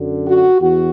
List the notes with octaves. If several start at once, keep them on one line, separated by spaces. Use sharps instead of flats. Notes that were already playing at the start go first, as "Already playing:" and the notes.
Already playing: F#2 D3
F#4
E2 F#4